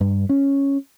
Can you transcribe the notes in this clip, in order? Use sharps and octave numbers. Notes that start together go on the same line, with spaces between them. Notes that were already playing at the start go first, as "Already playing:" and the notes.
G2
C#4